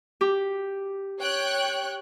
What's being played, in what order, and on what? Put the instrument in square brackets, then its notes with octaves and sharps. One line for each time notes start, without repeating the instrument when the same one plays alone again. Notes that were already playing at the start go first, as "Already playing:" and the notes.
[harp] G4
[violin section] C#5 G5 F#6